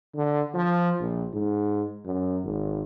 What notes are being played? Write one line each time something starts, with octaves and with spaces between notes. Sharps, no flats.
D3
F3
A#1
G#2
F#2
G#1